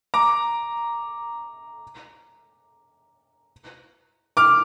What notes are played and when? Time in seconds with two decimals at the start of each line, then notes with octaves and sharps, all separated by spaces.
0.14 A#5 D6
4.37 D6 F6